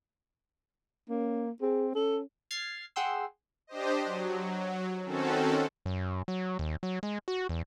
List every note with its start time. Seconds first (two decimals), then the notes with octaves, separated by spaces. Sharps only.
1.09 A#3 C#4
1.61 C4 G#4
1.95 C#4 A4
2.51 F6 G#6 A6 C7
2.96 G#4 F#5 G5 C6 E6
3.67 D4 G4 C5 D#5
4.05 F#3
5.05 D#3 C4 C#4 F#4 A4
5.86 F#2
6.28 F#3
6.59 D#2
6.83 F#3
7.03 G#3
7.28 F#4
7.49 E2